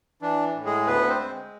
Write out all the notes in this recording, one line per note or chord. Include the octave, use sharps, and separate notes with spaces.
E3 D4
A2
G#3 G#4
D2 B3 B4
C4 C5
G#3